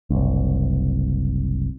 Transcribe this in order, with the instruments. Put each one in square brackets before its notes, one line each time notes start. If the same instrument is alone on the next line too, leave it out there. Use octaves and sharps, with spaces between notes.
[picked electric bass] F#1 C2